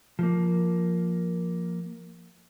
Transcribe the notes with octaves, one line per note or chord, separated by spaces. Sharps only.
F3 A#3